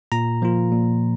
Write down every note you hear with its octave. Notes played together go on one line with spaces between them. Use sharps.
A#2 A#5
F3 A#3 F4
A#2